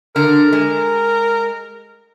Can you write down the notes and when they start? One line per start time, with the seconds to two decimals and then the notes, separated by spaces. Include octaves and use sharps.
0.16 D3 A#4
0.53 G#3